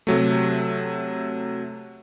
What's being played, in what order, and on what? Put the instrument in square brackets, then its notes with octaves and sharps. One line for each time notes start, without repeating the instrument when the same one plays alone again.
[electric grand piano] C3 F#3 A3